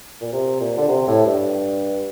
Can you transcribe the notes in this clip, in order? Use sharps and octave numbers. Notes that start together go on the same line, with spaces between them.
A#2
C3
A#2
D3
C3
A2
G2